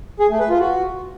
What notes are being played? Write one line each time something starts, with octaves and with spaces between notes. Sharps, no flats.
G#4
A3
B4
F4
F#4